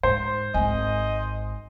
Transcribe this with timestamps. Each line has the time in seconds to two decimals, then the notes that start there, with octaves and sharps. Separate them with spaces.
0.03 G#2 C5
0.54 G#1 G#3 D#5 G#5